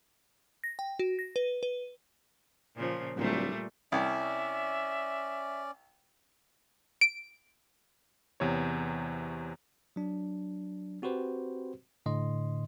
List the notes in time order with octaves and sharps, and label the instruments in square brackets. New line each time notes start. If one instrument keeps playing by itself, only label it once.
[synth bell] A#6
G5
F#4
A#6
B4
B4
[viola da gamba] A#2 C#3 F3
[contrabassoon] D1 [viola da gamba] A#2 G3 A3
[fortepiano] C2 [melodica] C#4 D5 [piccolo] E5
[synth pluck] D7
[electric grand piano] E2 C3 C#5
[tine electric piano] F#3 D4
C4 F#4 G4 B4 C5
A2 D3 D#5 C6